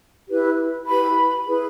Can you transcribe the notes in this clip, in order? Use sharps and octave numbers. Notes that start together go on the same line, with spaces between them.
E4 G4 B4
E4 G4 B4 B5
E4 G#4 B4